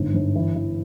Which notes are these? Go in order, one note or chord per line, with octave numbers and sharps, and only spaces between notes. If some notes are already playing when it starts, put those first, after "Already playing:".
Already playing: G1 G#2
G1
E3
E3